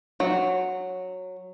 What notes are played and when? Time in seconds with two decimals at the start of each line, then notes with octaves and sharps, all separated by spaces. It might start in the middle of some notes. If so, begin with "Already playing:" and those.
0.20 F#3